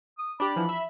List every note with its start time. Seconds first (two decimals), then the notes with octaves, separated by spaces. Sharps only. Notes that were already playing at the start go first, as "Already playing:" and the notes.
0.19 D#6
0.40 D4 G4 B5
0.56 E3 F3
0.69 E5